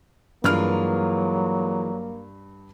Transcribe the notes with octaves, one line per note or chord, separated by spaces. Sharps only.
G2 E3 F#3 G#3 A#3 F4 F6